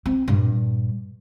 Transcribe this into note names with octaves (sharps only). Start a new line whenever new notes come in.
C4
G2 A#2